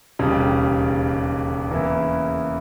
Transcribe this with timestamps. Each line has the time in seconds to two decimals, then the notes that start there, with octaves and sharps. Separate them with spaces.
0.19 E1 D#2 C#3 G3
1.71 E2 C#3 E3 A#3 E4